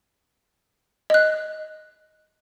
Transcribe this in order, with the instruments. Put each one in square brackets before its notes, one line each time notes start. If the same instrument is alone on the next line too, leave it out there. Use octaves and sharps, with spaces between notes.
[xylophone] D#5 F#6